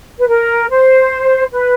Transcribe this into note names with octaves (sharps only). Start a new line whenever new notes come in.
B4
A#4
C5
B4